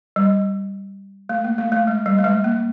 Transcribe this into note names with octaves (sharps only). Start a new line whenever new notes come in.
G3
A3
A#3
A3
A3
G#3
G3
A3
G#3
A#3